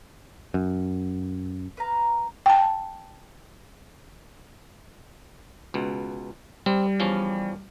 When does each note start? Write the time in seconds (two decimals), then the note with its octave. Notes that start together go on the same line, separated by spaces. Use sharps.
0.54 F#2
1.77 B4 F5 A#5
2.46 G5 A5
5.74 C#2 B2
6.66 G3 C4
7.00 E2 F3 C#4